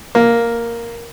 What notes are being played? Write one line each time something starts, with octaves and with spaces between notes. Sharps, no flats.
A#3